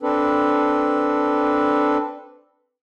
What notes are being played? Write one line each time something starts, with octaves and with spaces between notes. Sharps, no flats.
C4 D4 A4 B4